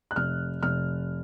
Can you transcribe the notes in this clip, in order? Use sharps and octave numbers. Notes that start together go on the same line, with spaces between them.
F#6
F1 F6
F1 F6